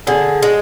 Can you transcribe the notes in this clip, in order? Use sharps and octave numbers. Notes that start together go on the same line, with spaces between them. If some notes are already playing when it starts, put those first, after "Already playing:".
D3 G#4
G#3